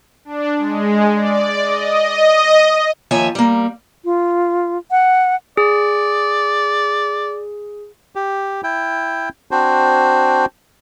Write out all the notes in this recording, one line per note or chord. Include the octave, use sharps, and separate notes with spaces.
D4
G#3
D5
D#5
D#2 F3 C#5 E5 G#5
G3 A#3
F4
F#5
G#4 D5
G4
E4 G5
C4 D4 F#4 C5